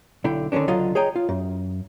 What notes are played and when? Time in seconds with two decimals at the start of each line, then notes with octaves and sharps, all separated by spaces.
0.24 B1 D3 E4 G5
0.52 D3 D#3 F3 C#4 D4
0.68 C#2 D3 F#3 F4 D#5
0.95 G#4 C#5 D#5 G5 A#5
1.16 F4
1.29 F#2